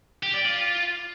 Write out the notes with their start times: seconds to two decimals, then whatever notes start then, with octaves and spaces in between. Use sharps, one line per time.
0.23 G4
0.34 D5
0.45 F4